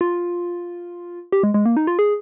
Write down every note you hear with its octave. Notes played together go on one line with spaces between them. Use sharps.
F4
G4
G#3
G#3
A#3
D#4
F4
G#4